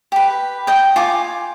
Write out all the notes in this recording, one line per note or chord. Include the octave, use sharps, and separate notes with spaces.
G4 B4
D#5 G5
F4 G#5 D6